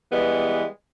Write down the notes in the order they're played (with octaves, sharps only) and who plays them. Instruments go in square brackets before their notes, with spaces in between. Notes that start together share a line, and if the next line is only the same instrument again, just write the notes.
[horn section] E3 G3 G#3 B3